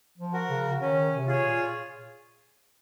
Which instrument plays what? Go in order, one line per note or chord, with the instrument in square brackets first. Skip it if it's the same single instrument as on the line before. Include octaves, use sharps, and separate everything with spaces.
[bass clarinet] F3
[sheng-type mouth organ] F#4 A#4
[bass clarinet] C#3
[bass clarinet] D#3 [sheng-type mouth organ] C#4
[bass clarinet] C3
[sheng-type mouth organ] F4 G#4 C#5
[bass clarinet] A#2